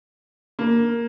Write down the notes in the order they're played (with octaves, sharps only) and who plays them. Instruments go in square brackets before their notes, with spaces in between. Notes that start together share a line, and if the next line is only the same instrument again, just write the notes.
[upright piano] A#3